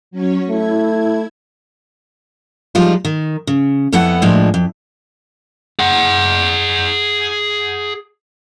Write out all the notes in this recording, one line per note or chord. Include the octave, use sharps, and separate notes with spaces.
F#3 C#4 C#5
A3 E4 G#6
F3 G3 G#3 D#4 F4
D#3
C#3
F2 B3 E4 A4 F#5
A2 F3 G#3 A#3 D4
F2
G#4 F#5